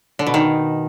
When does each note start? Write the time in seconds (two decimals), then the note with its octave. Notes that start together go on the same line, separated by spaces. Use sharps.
0.19 D3
0.27 B2
0.34 D#3